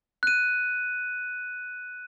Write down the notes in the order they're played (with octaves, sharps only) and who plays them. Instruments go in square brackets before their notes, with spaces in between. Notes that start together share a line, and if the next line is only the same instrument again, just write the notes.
[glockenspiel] F#6 D#7